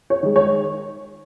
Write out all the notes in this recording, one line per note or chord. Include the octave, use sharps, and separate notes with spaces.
C#5
D#3 G#3
C#5